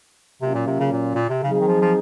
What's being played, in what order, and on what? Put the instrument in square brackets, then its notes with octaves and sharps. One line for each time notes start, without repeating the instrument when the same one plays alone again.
[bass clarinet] C3 [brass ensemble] F#3 A#3 C#4 F4
[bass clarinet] A#2
C3
C#3
A#2
A#2
C3
[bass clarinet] C#3 [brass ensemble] F#3 C4 D#4 G#4
[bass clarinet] C#3
D#3
F3
F3